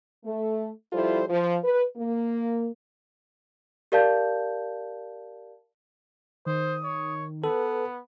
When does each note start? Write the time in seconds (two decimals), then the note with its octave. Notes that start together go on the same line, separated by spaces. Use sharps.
0.25 A3
0.92 F3 G3 E4 F4 A4 C5
1.29 F3
1.64 B4
1.97 A#3
3.92 G4 A#4 D5 F5 A5 G6
6.46 D#3 C5 D#6
6.83 C#5
7.44 B3 A4 B4